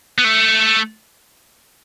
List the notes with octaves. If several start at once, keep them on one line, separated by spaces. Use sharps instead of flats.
B3
A3